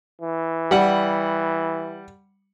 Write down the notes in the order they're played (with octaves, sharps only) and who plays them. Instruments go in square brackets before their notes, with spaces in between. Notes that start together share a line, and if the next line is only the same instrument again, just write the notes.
[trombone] E3
[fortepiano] G3 F#5